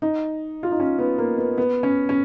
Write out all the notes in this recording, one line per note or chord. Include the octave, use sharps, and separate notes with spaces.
D#4
F4
D#4
C#4
B3
A#3
B3
B3
C#4
C#4